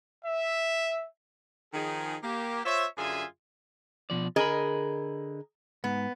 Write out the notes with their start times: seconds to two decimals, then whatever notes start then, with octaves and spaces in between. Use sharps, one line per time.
0.24 E5
1.74 D#3 F3 D#4 G#4
2.22 A#3 G4
2.65 F4 C5 C#5 E5
2.97 F#2 D3 F4 G#4 E5 G#5
4.10 B2 F3 D5
4.36 D3 G#4 A#4 D#5 B5
5.84 G#2 B3